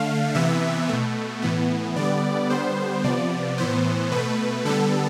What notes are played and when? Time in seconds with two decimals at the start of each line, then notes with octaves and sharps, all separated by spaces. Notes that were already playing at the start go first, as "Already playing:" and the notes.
Already playing: D3 A3 F5
0.34 C3 E3 B3 E5
0.89 B2 A3
1.42 A2 E3 B3
1.96 D3 G3 B3 D5
2.50 D3 G3 B3 C5
3.04 C3 F3 B3 D5
3.58 A2 E3 B3 C5
4.12 B2 A3 B4
4.65 D3 G3 B3 A4